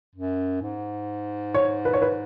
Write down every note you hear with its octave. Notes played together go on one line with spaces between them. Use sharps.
F#2
G#2
C#5
B4
C#5
B4